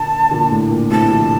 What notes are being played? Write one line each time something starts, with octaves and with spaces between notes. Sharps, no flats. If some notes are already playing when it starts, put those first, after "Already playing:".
Already playing: A#2 D3 A5
A#2 D3
A2
A#2
A2 C3 A5
D3 F3